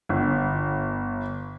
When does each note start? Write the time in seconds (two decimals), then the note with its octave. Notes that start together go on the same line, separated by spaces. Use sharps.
0.09 G1